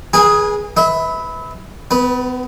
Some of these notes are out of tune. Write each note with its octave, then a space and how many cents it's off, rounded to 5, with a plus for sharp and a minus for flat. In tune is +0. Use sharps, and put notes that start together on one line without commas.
G#4 +5 B4 -35 G#5 -30
B4 +10 E5 -30
B3 +35 B4 -10